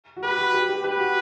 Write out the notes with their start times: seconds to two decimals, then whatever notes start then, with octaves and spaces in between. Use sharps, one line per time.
0.17 F#4
0.23 G4 B4
0.38 F#4
0.54 G4
0.69 G4
0.84 G4 B4
1.00 F#4